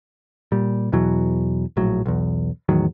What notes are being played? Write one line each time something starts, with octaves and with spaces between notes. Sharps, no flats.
A#2 G3
E2 B2 E3 F#3
A#1 A2 F#3
B1 E2
E2 A2 D#3 F#3